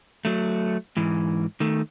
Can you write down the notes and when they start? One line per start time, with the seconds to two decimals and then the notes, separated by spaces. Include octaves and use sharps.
0.25 F#3 A3
0.97 G#2 E3
1.60 D#3 A3